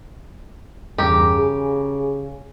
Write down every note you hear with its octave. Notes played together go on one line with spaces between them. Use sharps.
E2 G2 C#3 G4 A#4 D6
G#4